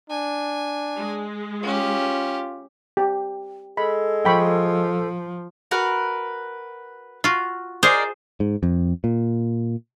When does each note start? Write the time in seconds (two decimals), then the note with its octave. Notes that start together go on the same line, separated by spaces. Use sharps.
0.10 D4 G#5
0.98 G#3
1.63 C#4 F4 G4
2.97 G4
3.77 G#3 A4 B5
4.25 F3 G5 B5 C#6
5.71 F#4 A#4 B4
7.24 F4 F#4
7.83 G#4 A#4 C5 D5 D#5
8.40 G#2
8.63 F2
9.04 A#2